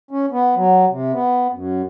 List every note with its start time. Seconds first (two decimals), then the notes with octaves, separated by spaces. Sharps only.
0.11 C#4
0.32 B3
0.56 F#3
0.90 C3
1.13 B3
1.53 F#2